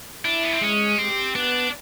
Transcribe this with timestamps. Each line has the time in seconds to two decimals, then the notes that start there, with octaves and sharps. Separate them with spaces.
0.25 D4 E4
0.43 B3
0.53 C4
0.61 G#3 C#4
0.98 C4 G4
1.35 B3 D4